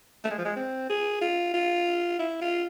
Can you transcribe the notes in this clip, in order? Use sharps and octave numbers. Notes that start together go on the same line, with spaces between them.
A3
G#3
F3
G#3
C4
G#4
F4
F4
E4
F4